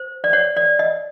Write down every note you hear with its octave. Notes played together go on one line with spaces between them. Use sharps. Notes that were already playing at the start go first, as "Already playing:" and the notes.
Already playing: C5
D5
C#5
D5
D#5